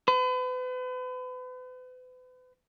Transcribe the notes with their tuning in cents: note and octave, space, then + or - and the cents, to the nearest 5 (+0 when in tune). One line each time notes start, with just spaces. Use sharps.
B4 +40